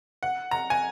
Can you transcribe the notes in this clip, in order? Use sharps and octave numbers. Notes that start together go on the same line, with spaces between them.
F#5
A#5
G#5